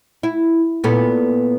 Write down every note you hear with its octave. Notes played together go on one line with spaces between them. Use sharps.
E4
A#2 B3 A4